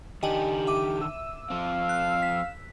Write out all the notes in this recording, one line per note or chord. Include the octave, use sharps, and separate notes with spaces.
D#3 D4 G4 D#5 G#5 F#7
E5 D6 D#7
E6
F3 C4 F5
F#6
B6